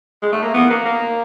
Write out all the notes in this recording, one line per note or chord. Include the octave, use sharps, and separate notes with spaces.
G#3
A3
A#3
B3
A#3
A#3